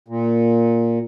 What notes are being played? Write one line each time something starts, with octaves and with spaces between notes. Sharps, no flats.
A#2